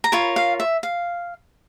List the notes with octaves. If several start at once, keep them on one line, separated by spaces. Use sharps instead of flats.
A#5
F4 A#4 C#5 B5
F5
E5
F5